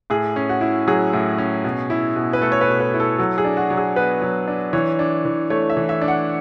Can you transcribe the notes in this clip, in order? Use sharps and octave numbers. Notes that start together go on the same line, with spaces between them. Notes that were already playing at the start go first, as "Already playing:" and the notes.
A2 G#4
C#4
F#4
E4
F#3 G#4
A2
C#4
B2
E4
B2
B4
A3 A4
C#5
B4
B2
B4
E4
A4
F#3 A4
G#4
D4
F#4
F#3
G#4
B3 B4
F#3
D4
E3 C#5
D4
E3
A3 C#5
E5
E3
E5
D4
F#5